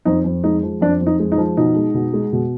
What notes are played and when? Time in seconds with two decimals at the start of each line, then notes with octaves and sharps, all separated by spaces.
0.05 F2 D#4
0.24 F2
0.44 G#3 D#4
0.63 F3
0.81 F2 D4
1.01 F2
1.06 D#4
1.20 G#3
1.32 D#4
1.38 F3
1.57 B2 D#4
1.76 G#3
1.94 B2
2.13 G#3
2.33 B2